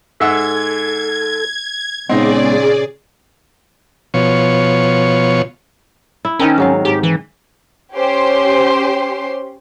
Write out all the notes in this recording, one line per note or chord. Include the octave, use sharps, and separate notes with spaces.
G#2 A4 E5 F#5 G#6
A#2 C#3 G#3 B3 C4 D#4 G#4 D5
B2 F3 C#5
E4
D#3 C4 C#4 A#4
G#2 F#3 F5
G#2 G4
E3
C#4 G4 C5 C6